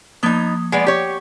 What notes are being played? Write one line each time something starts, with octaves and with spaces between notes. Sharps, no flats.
F3 A#3 B3 D#4 D#6
G#3 B3 D5
G4 C#5